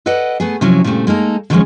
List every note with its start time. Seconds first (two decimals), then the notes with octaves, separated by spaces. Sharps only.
0.06 A4 B4 D5 D#5 F#5
0.40 A3 B3 G#4
0.61 C3 F3 F#3 C#4 E4
0.84 A#2 C#3 G3 A3 C4
1.07 G#3 A#3 D#4 A4
1.50 D3 D#3 F3 F#3 G#3 C#4